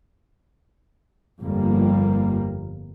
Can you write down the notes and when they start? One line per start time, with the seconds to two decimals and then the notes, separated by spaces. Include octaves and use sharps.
1.41 G1 F2 G3 A#3